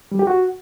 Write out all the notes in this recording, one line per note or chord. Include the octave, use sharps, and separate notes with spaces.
G3
G4
F#4